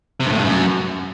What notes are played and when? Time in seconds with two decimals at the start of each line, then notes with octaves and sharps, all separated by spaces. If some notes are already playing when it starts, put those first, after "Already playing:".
0.20 C3
0.26 G2
0.32 A2
0.38 G2
0.44 F#2